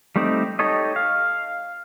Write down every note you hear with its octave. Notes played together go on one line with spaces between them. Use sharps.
G3 A3 C4 D#4 D5
D#4 G4 A4 C#5 D#5
F5